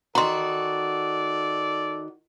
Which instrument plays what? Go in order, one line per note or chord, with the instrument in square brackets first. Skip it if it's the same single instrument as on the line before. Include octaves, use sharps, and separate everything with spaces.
[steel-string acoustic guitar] D#3 F#4 [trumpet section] A4 D5 [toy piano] A#5 C6